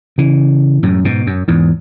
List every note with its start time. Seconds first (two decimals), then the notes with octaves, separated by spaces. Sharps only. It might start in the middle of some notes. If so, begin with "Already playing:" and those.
0.18 C#3 E3
0.83 F#2 A2
1.05 G#2 B2
1.27 F#2
1.48 E2 G#2